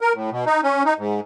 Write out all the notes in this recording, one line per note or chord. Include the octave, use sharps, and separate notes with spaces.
A#4
A2
B2
D#4
C#4
D#4
G#2